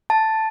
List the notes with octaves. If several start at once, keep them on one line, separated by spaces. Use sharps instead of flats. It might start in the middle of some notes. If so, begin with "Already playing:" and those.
A5